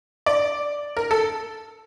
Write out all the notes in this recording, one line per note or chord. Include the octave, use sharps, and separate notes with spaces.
D5
A#4
A4